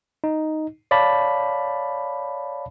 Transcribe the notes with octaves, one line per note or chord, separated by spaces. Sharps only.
D#4
C#5 D5 F5 A5 B5